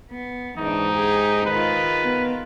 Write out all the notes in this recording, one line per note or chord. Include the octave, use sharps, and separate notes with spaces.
B3
G#2 E3 D4 D#4
G4 G#4
D#3 F4 B4
B3